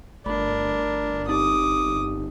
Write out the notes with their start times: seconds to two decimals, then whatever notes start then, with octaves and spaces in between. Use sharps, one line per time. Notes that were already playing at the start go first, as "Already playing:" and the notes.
0.26 G1 A3 D4 A#4 B5
1.27 C4 D#4 G4 D6 D#6